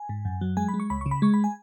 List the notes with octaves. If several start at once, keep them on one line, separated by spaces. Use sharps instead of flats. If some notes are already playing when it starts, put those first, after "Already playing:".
Already playing: G#5
G#2
F#2
F#3
G#3 G#5
B5
G#3
C#6
C#2 B5
C#3 C#6
B5
G#3 C#6
B5
G#5